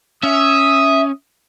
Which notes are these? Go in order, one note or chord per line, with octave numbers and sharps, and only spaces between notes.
C#4 E5 D#6